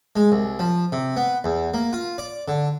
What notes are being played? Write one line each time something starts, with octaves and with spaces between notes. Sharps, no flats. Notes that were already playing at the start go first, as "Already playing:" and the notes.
G#3
C2
F3
C3
B3
E2
A#3
F4
D5
D3